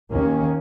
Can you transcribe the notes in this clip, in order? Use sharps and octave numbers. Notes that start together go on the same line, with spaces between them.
D#2 D#3 A#3 C#4